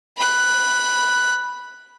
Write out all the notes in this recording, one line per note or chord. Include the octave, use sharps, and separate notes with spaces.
B5 F#6